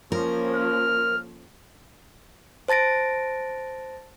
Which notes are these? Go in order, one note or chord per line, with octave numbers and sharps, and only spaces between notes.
F3 A#3 C#4 A#4
F6
C5 A5 A6 A#6 D7